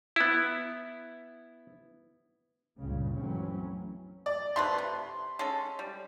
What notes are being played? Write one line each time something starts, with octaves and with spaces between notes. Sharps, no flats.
B3 E4
C#2 G2 A#2 C#3
E3 F#3 A3 C4 C#4
D5
C3 A3 B4 C6
C3
G#3 C#4 A4
G3